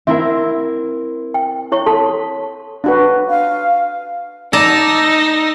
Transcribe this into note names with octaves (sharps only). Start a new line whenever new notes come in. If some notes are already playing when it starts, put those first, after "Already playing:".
C4 E4 A#4 E5 F#5
G5
E4 C#5 C#6
A4 A5 C6 B6
D4 F#4 B4
F5
D#4 D5 A5 A#5 E6 A#6 E7